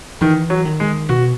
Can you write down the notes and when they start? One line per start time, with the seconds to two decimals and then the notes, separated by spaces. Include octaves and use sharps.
0.21 D#3 E3
0.50 F#3
0.65 D#3
0.80 G#3
1.09 B2 F#4